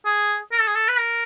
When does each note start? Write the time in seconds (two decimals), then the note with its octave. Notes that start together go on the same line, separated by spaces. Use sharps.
0.05 G#4
0.52 A#4
0.60 A4
0.67 G#4
0.75 A4
0.88 B4
0.98 A#4